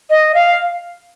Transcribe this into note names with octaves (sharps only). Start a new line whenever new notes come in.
D#5
F5